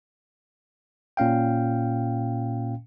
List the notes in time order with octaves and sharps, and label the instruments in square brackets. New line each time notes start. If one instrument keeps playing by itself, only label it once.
[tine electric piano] A#2 C#4 F5 G5